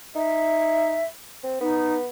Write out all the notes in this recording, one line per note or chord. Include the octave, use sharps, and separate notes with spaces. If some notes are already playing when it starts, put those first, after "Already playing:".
D#4 E5
C4
B3 D#4